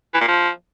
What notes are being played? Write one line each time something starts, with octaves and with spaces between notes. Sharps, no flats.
E3
A#2
F3